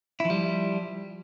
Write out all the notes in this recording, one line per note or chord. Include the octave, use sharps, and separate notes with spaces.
F3 G3 E4